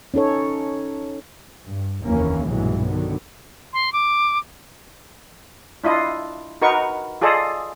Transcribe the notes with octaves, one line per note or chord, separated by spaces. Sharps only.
C#4 D#4 A4 C#5
G2
F1 D#2 E3 A#3 C#4
B1 G2 A#2 E3 F#3 G#3
D3 D#3 F#3 B3
C6
D6
D4 E4 F4 D#5
D#4 F#4 A#4 B4 C#6
F4 G#4 A4 D5 D#5